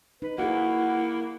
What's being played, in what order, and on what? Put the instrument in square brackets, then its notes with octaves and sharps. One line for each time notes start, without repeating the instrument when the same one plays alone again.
[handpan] D#4 [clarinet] B4
[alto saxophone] A#3 [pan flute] E4 [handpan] F#4 G#4 [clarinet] F#5